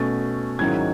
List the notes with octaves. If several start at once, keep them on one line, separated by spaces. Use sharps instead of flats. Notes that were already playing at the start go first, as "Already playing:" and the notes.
Already playing: B2 A3 C#4 A6
G#2 D#3 F#3 C#4 E4 G#6